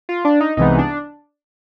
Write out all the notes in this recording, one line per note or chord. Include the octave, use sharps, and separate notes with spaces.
F4
D4
D#4
C2 C3 E3 G#3 B3 D#4
D4